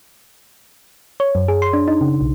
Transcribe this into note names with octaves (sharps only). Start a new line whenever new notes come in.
C#5
F#2
G#4
C6
D4
D#4
C#3
B1